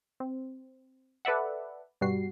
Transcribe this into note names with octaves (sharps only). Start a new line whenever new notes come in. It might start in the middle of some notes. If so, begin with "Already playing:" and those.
C4
A4 B4 D5 E5 F#5
G2 B2 G3 F#4 C7